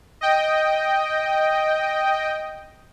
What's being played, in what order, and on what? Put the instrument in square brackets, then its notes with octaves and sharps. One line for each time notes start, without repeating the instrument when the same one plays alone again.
[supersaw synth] D#5 G5